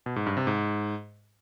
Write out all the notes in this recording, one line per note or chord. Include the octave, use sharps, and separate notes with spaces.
B2
G#2
G2
C3
G#2